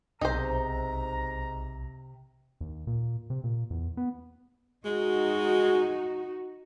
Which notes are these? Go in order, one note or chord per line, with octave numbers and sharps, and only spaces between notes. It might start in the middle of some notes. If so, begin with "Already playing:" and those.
B1 G#2 C3 D#4 C5 A#5
D#2
A#2
C3
A#2
E2
B3
G#3 D#4 F#4